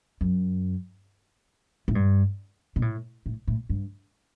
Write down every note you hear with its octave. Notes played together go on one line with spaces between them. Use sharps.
F#2
A2
G2
B2
A2
A2
A2
G2